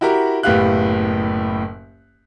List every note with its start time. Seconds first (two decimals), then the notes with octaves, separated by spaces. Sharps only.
0.01 E4 F#4 G4 A#4 A#5
0.43 F#1 A2 B3 G4 F5 F#6